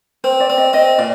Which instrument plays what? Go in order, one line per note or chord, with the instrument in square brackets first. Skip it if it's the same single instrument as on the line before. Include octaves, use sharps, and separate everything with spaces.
[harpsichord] C4 [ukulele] C5
[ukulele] D5
[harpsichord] C4
[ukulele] D#5
[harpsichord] C4 [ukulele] D#5
[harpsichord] A#2 [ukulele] D5